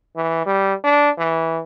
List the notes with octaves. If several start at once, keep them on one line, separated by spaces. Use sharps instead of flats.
E3
G3
D4
E3